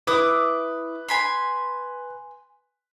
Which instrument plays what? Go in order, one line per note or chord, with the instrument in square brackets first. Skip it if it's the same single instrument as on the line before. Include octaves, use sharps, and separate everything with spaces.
[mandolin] E4 D6 D#6 [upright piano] B4
[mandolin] G#5 B5 C6